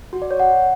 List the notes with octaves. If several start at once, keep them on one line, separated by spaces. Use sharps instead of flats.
F#4
D5
C#5
F#5